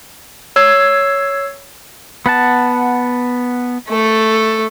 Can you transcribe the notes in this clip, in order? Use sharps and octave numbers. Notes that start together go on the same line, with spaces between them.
C#5 E6 G#6 C7
B3 F#5 A5
A3 A4